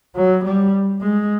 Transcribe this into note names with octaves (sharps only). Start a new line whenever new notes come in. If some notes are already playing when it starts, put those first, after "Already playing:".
F#3
G3
G#3